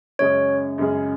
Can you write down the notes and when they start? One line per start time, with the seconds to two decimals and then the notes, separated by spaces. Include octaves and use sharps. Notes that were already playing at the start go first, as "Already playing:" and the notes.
0.19 F#2 C#3 G#3 C#4 G#4 C#5
0.78 F#2 C#3 G#3 C#4 G#4